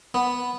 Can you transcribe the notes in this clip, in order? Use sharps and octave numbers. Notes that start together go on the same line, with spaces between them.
B3